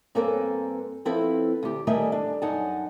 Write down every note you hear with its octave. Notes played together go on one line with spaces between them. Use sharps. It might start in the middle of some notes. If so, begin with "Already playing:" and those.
G2 A#3 C4 A4 B4 G#5
F3 C4 E4 A4 B4
D2 G4
D#3 G3 A3 D#5 E5 G#5
D4
F#2 D#4 F#5 G#5 A5